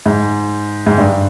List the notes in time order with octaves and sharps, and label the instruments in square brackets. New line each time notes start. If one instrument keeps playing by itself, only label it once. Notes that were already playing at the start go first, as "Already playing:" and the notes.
[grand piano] G#2
G#2
G2